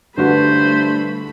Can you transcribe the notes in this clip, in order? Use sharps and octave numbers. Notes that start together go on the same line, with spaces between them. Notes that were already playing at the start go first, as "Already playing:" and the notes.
G2 D3 A3 F#4 B4 C5 B5